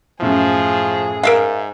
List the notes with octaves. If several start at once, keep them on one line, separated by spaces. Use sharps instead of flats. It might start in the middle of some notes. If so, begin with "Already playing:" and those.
F#2 A2 F3 E4 G#4
G#2 A#4 E5 F5